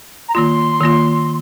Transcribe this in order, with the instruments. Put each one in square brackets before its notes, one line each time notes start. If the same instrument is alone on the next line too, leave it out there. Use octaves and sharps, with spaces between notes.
[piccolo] A#5
[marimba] D#3 A#3 F4 [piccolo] C6
[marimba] D#3 A#3 F4